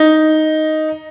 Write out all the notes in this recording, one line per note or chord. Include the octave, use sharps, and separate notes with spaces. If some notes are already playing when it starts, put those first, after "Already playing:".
Already playing: D#4